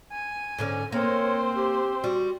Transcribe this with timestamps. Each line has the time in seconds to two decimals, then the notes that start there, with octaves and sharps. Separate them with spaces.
0.12 G#5
0.59 G#2 D3 C#4
0.92 A#3 C4 C5 C#5
1.56 G4
2.04 G3 F#4